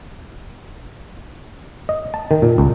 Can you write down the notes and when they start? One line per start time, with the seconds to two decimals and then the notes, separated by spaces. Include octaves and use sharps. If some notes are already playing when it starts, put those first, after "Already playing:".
1.89 D#5
2.14 A5
2.31 D#3
2.42 A#2
2.58 C#2